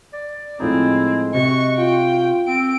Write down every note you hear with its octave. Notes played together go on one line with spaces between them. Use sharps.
D5
A2 F3 G#3 C4 D#4 E4
C3 F#4 D#5 C#6
F4 G5
C4 D7